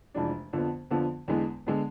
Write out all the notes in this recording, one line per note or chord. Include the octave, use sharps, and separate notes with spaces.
F1 F2 E3 G#3 D4
F2 D3 F3 B3
F2 D3 F3 B3
E2 D3 G#3 B3
D3 G#3 B3